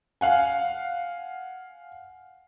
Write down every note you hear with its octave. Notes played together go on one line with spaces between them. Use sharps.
F5 F#5 G#5